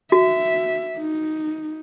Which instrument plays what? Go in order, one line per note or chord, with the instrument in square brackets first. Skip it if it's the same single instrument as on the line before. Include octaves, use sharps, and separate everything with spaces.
[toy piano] F#4 [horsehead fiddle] E5
[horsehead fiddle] D#4